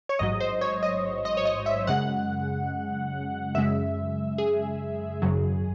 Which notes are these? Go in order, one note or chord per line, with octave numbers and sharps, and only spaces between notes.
C#5
A1 G#2 F#3 D#5
C5
C#5
D#5
D#5
C#5
D#5
E5
F#2 C#3 G#3 F#5
F#2 C#3 G#3 E5
G#4
G#1 F#2 C#3 F#3